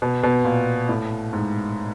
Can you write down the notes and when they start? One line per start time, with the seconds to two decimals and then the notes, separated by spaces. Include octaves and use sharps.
0.02 B2
0.23 B2
0.45 A#2
0.89 A2
1.33 G#2